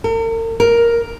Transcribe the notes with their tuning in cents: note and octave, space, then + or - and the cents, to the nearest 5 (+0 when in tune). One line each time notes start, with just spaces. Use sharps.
A#4 -45
A#4 +5